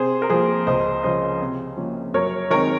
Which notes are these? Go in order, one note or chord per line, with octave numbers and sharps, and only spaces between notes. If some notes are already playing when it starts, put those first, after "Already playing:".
Already playing: C3 G#4 C5
A#4
F3 A#3 G#4 C5
C#2 C5 D#5
C#3 F3 C5 D#5
C3
F3 A#3 C#4
F#2 A#4 C#5
D#3 G#3 C4 A#4 C#5